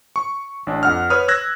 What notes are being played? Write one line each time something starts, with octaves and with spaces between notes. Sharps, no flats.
C#6
A1 D4
F2 F#5 F6
B4 C#5 B5 D#6 F6
E6 F#6 G#6 A#6